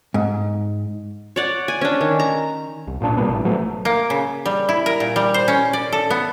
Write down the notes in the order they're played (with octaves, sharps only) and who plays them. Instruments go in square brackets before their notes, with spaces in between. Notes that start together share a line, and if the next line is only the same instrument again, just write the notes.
[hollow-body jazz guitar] G#2
[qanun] C#5 D5 F#5
G#5
C#4 D4
D#3
A#5
[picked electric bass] C2
G#1 A#2 C#3 D4
B2 G3 A#3 B3
G#1 A2
F3 F#3 A3 B3
[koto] A#3
C#3
G3
E4
A#4
A#2
G3
C5
C#4
D5
A4
B3